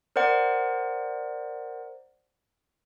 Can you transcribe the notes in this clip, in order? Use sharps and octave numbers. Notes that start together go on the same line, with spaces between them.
A#4 C5 D5 F#5